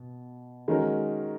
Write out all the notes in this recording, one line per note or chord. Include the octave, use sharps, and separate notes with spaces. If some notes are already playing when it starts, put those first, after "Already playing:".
Already playing: B2
D#3 G#3 C#4 F#4 A#4